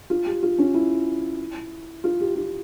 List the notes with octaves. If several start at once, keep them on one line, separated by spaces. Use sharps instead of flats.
F4
G4
F4
C#4
E4
F4
G4
F4